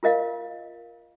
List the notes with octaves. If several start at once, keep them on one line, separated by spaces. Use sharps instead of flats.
F4 A#4 D#5 F5